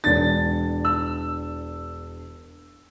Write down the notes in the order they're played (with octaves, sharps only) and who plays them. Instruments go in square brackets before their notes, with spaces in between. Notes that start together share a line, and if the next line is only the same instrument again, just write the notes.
[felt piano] E1 D4 [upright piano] A6
[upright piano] E6